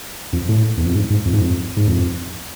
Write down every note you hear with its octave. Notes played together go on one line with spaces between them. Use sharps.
F2
A2
E2
F2
G#2
G#2
F2
G#2
F2
G#2
F2